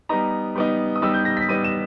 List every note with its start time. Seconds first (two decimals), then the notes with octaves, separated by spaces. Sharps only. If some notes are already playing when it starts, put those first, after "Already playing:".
0.09 G3 B3 D#4 A#5
0.56 G3 B3 D#4
0.96 D#6
1.02 G3 B3 D#4 E6
1.14 G6
1.25 A#6
1.37 B6
1.49 G3 B3 D#4 D#7
1.64 E7